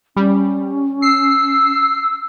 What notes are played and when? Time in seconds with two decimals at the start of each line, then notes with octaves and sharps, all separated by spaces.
0.16 G3 C#4
1.02 E6 C7